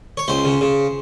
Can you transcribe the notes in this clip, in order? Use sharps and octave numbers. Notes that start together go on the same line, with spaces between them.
C#5
C#2 C5
C#3
C#3